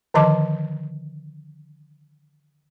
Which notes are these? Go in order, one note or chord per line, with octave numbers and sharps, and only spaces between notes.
D3 D#3 F3 D#5 A5 D6